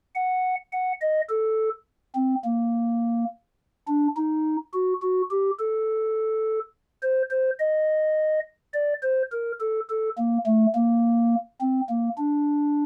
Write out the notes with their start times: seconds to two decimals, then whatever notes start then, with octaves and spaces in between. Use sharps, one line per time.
0.15 F#5
0.72 F#5
1.01 D#5
1.29 A4
2.15 C4
2.45 A#3
3.88 D4
4.17 D#4
4.74 F#4
5.02 F#4
5.31 G4
5.59 A4
7.03 C5
7.31 C5
7.60 D#5
8.74 D5
9.03 C5
9.32 A#4
9.60 A4
9.89 A4
10.18 A#3
10.46 A3
10.75 A#3
11.61 C4
11.89 A#3
12.18 D4